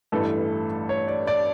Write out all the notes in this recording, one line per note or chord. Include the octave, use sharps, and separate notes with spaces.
A1 G2 E3 A3 A4
C#5
D5
D5